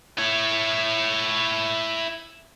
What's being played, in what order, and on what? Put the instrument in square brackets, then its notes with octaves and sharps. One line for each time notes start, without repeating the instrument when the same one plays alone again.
[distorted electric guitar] E4 C#5